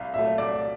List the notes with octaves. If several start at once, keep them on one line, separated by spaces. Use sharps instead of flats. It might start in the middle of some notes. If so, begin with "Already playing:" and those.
Already playing: C2 F5
A#2 F#3 A3 E5
C2 D5